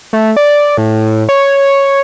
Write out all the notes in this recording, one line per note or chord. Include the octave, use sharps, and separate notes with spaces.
A3
D5
A2
C#5